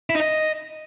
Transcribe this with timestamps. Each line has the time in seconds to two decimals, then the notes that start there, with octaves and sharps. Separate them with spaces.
0.10 E4
0.15 D#4
0.20 D#5